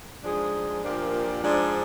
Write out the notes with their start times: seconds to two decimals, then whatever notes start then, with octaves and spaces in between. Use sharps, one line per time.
0.23 G#2 F3 G#3 D4 G#4
0.82 A#2 F3 A#3 D4 G4
1.41 G#2 F3 G#3 D4